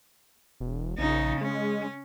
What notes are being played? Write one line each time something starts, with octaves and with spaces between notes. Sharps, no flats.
E1
A#1 C#3 D#4
G#3 C#4